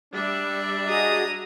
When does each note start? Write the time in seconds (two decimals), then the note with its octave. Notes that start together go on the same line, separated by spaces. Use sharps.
0.14 G3 D4 D5 E5
0.88 F#4 G#4 D#5 A#5 D#6